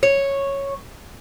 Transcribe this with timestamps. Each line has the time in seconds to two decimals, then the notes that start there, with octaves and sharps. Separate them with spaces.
0.03 C#5